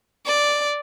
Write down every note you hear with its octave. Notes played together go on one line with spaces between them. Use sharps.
D5